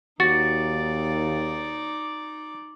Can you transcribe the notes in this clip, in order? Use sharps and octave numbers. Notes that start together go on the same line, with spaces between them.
D#2 D#4 F#4 D5 A6